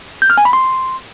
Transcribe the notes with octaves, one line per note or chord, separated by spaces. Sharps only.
G6
F6
G#5
B5
C6